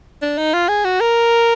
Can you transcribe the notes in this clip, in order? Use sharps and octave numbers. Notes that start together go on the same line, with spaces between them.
D4
D#4
F4
G#4
F#4
A#4